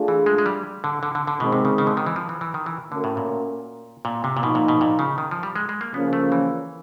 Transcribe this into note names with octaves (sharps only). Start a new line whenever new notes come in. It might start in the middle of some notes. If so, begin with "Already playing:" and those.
Already playing: A3 D4 F4 G#4
E3
G#3
G#3
G3
D3
D3
D3
D3
B2 D#3 G#3 C4
C3
C#3
C#3
D3
D#3
E3
F3
E3
E3
D#3
E3
D3 A3 C#4 F#4 A#4
A2
A#2
A#2
C3
A#2
B2 F3 A#3 D#4
A#2
B2
A#2
C#3
D#3
F3
G3
G#3
G#3
A#3
C#3 F3 A#3 B3 C#4
A3
E3